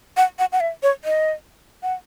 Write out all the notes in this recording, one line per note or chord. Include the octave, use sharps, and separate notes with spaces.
F#5
F#5
F#5
E5
C#5
D#5
F#5